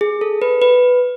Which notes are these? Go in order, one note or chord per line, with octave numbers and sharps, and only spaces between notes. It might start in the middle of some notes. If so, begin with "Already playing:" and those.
G#4
A4
B4
B4